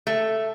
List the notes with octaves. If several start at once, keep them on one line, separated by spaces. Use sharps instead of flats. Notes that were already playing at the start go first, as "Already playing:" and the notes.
A3